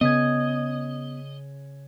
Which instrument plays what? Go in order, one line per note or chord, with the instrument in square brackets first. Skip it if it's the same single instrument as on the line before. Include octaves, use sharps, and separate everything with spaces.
[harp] C#3 G#6 [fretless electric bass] B3 [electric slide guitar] D#5